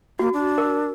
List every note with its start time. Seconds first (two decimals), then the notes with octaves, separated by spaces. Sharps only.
0.19 A#3 F#4
0.34 D4
0.58 A#4